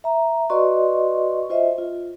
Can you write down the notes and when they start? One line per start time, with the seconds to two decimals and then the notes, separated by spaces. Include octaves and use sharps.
0.04 E5 A#5
0.50 F#4 B4 D5 D#5 C6 C#6
1.50 F4 C5 D#5 E5
1.78 F4